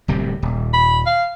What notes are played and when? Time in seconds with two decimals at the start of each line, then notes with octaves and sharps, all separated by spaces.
0.08 D1 C3 G3
0.42 D#1
0.73 B5
1.06 F5